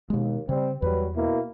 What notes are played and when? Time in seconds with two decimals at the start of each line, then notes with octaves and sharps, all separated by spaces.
0.10 D#2 B2 G#3
0.49 C#3 G3 C4
0.82 E2 F#3 G3 B4
1.16 B2 A#3 E4